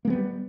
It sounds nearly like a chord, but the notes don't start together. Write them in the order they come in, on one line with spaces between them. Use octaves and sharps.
A#3 G#3 B3 G3